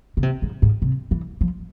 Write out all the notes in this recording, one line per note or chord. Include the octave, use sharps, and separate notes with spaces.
C#3
C3
G#2
G#2
C3
E3
F3